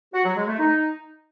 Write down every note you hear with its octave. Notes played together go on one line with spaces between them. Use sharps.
F#4
F#3
G#3
A3
D#4